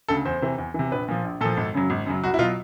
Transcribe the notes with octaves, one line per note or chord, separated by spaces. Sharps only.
D2 C#3 A4
E2 C5
C3 E3
E2
C3 E3
A#1 B4
A#2 F3
A#1
A#2 F3 A4
G#1
F#2 C#3 F#3
G#1
F#2 C#3 F#3
C2 F#4
E4
B2 F#3 F4